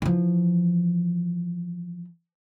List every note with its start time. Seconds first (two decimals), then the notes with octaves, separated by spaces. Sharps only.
0.02 E3 F3